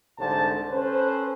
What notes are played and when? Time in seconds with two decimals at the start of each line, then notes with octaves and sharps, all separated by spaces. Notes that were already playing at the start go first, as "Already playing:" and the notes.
0.19 C2 G#2 D3 C5 A5
0.71 C#4 A4 B4 C5